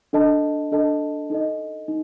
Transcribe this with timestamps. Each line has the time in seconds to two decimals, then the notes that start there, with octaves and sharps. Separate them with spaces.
0.13 D4 A4 D#5 A5
0.72 D4 A4 D#5 A5
1.30 D#4 A4 D#5
1.88 D#4